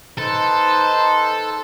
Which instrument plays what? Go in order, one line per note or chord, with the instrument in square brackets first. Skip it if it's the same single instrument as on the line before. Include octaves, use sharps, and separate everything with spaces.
[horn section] D#4 B4 C5 [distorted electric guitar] A4